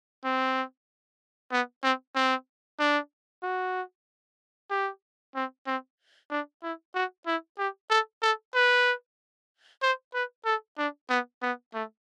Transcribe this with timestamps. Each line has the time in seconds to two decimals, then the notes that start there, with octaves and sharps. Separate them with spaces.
0.24 C4
1.52 B3
1.83 C4
2.16 C4
2.79 D4
3.43 F#4
4.70 G4
5.35 C4
5.67 C4
6.30 D4
6.63 E4
6.95 F#4
7.26 E4
7.58 G4
7.90 A4
8.22 A4
8.54 B4
9.82 C5
10.14 B4
10.45 A4
10.78 D4
11.10 B3
11.42 B3
11.74 A3